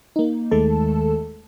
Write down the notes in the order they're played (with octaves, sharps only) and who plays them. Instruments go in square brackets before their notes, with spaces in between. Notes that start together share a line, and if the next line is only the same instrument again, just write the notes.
[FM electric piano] A#3 D#4
D#2 D#3 G#3 A3 A4 A5